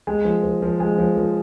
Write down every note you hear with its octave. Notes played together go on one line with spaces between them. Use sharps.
G#3
F3
F3
F3
G#3
F3
F3